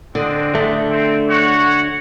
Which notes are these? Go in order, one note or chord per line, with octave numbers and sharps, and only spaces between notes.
D3 C4 D4 D#5
D3 A3
C4
F#4 C#5 F#5